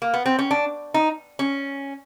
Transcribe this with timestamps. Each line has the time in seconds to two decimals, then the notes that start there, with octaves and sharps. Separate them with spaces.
0.02 A#3
0.14 B3
0.26 C4
0.39 C#4
0.51 D4
0.94 D#4
1.39 C#4